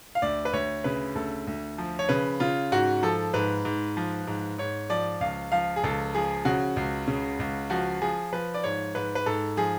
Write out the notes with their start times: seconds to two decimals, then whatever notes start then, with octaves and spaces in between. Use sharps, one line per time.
0.15 F5
0.22 D2 D5
0.45 B4
0.53 D2 C#5
0.84 C#3 B4
1.15 D2 A4
1.47 D2
1.78 F3
1.99 C#5
2.09 C#3 B4
2.40 C#3 F4
2.72 G#2 F#4
3.03 F3 A4
3.34 G#2 B4
3.65 G#2
3.97 F3
4.27 G#2
4.58 G#2 C#5
4.90 F3 D5
5.21 C#2 F5
5.52 F3 F5
5.76 G#4
5.84 C#2 A4
6.14 F3 G#4
6.45 C#3 F#4
6.76 C#2
7.07 C#3
7.39 C#2
7.70 F3 F#4
8.02 F3 G#4
8.33 F3 B4
8.54 D5
8.64 G#2 C#5
8.95 G#2 B4
9.15 B4
9.26 G#2 A4
9.57 F3 G#4